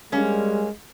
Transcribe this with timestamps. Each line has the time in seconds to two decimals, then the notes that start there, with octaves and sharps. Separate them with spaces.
0.12 G3 G#3 A#3 C#4